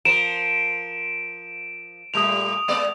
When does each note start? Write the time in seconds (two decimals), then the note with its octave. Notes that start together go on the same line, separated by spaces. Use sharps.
0.05 F3 A#4 D7 E7
2.14 A#2 G3 A3 D#6 F7
2.68 G#3 B3 D5